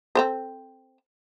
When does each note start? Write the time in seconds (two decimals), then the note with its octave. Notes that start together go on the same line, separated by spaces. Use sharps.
0.15 C4 A4 C5